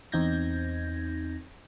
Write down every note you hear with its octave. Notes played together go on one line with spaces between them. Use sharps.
E2 C4 D#4 G6 G#6 A#6